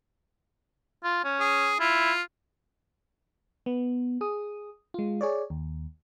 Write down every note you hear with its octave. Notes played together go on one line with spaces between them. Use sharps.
F4
C#4
G#4
E4 F4
B3
G#4 D#6
G#3 F4
G#4 C#5 D5
D#2